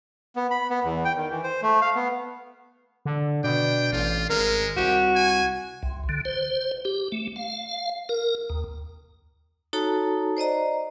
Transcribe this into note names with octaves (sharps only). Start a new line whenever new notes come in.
B3
B5
B3
E2
G5
D#3
E3
C5
A3
F5
B3
D3
B2 D4 G5
A1 F4
G#1 G#3 A#4
C2 F#4 G4
G#5
C2
D3
C5
G4
A3
F5
A#4
D#2
D#4 F#4 A4 C#5 A5 A#5
C5 D5 D#5 A#5